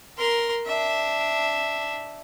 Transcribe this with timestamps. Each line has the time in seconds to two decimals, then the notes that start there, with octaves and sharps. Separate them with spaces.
0.18 A#4 C6
0.66 D4 E5